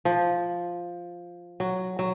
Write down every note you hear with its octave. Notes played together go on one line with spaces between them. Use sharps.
F3
F#3
F#3